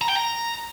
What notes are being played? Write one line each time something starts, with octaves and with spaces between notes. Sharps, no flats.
A#5
G5
A#5